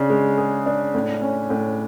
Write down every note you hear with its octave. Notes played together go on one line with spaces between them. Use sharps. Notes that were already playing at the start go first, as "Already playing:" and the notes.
Already playing: C#3 D4
G#3
G#4
D4
A2
C#4
A2